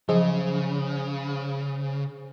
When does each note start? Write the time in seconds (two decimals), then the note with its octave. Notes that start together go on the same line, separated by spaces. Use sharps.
0.09 C#3 F3 F#3 G#4 C5